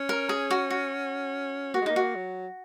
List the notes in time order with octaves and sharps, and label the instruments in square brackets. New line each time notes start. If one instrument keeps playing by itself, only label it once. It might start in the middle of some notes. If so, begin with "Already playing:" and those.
Already playing: [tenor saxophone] C#4
[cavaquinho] A#4
G#4
F#4
F#4
[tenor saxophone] A#3 [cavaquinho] F#4
[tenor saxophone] G#3
[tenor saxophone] A#3 [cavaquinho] D#4
[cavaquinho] F#4
[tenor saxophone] F#3